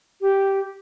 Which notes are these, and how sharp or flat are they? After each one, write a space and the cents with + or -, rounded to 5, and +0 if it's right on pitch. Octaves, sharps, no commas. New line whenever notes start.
G4 -5